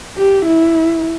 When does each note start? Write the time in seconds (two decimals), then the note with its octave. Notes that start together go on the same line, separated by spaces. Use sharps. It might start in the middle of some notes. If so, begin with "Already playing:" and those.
0.17 G4
0.46 E4